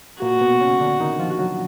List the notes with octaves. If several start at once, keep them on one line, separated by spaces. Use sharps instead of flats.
A#2 A#3 F#4
B2 B3
C#3 C#4
D3 D4
D#3 D#4
F3 F4
F#3 F#4